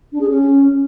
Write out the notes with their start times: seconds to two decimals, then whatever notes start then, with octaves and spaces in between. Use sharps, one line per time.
0.12 D4
0.21 G#4
0.29 C#4